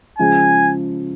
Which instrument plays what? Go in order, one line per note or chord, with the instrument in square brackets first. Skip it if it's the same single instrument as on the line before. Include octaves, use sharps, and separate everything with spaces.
[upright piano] C#3 F3 G#3 [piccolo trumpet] G#5